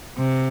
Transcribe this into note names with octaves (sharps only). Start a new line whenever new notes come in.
C3